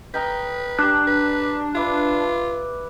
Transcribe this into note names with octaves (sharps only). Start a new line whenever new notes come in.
A#4 B4 D#5 G5
D4 G4 D5 F#6
B4
F4 B4 D5 E5